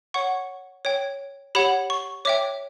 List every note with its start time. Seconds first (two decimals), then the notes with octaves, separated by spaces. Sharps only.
0.14 C#5 F#5 C#6
0.85 C#5 G5
1.55 G4 C#5 F#5 B5
1.90 C#6
2.25 C#5 E5 G5 D6